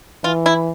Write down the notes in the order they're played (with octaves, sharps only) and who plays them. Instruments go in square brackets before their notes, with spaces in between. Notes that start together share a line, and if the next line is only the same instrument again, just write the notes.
[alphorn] E3 [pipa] F4
[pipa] E4